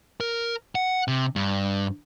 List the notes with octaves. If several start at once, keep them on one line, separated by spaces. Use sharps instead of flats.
A#4
F#5
C3
G2